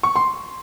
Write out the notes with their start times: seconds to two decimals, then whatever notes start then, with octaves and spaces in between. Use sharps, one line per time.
0.03 C#6
0.16 C6